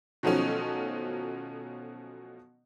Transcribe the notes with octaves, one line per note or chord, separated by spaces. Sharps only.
B2 D#3 F3 F#3 A3 C#4